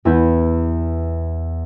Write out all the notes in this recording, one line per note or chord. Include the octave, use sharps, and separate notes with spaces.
E2 B3 E4 B4 G6